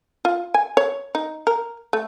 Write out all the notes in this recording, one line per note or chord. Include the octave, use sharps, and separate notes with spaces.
F4
G#5
C#5
D#4
A#4
A3